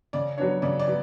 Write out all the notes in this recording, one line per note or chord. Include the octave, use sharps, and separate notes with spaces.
C#3 D5
F#3 B3 D4 C#5
C#3 D5
D5
F#3 B3